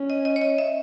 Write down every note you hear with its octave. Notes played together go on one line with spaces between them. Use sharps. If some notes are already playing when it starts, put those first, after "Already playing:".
Already playing: C#4
D#5
D#5
C#5
D#5
E5